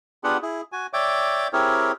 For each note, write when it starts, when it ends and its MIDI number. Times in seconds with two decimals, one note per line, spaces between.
0.24 0.37 59
0.24 0.37 62
0.24 0.37 65
0.24 0.37 67
0.24 0.37 68
0.24 0.37 78
0.42 0.61 64
0.42 0.61 68
0.72 0.87 66
0.72 0.87 80
0.93 1.48 73
0.93 1.48 74
0.93 1.48 76
0.93 1.48 79
0.93 1.48 86
1.53 1.92 60
1.53 1.92 64
1.53 1.92 67
1.53 1.92 68
1.53 1.92 70
1.53 1.92 73